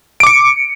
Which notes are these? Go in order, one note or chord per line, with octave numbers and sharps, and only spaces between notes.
D6 C#7 D7